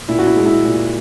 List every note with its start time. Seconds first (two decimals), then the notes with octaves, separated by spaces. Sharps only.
0.08 A#2 E4
0.19 F#4
0.27 E4
0.36 G#3
0.46 E4
0.65 A#2